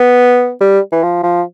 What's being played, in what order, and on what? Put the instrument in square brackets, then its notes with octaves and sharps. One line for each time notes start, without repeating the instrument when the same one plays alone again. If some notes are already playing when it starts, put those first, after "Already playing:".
Already playing: [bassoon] B3
G3
E3
F3
F3